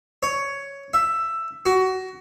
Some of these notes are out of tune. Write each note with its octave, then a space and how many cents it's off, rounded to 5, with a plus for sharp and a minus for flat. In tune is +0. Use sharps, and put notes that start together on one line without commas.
C#5 +5
E5 +10
F#4 +20